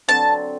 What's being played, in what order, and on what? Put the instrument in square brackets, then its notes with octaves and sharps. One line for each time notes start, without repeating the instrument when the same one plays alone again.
[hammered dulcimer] D3 F#3 C4 [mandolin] A5